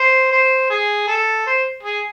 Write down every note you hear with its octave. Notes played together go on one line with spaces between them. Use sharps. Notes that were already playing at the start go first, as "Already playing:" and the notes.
Already playing: C5
C5
G#4
A4
C5
G#4